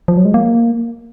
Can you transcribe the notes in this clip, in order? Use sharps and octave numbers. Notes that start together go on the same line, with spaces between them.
F3
F#3
G#3
A#3